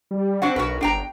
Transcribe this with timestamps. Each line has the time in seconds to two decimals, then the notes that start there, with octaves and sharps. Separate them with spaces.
0.11 G3
0.42 C4 D4 F#4 F#5
0.56 B1 F#4 A#4 B4
0.81 G1 D4 G5 A#5